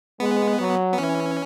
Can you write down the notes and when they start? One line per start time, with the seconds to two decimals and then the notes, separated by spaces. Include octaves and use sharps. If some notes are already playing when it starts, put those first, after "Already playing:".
0.19 G#3 B3
0.59 F#3
0.93 B3
0.98 E3 C#4